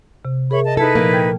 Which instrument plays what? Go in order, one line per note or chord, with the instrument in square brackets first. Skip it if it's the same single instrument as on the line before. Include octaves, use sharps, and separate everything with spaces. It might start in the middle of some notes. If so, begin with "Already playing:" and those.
[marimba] C3
[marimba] G#4 A#4 E5 [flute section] C#5 B5 C#6
[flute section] D#5 A5
[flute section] D#4 E4 B4 [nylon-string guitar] A4
[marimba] A#2 F3 [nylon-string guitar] A#3
[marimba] G5 G6 G#6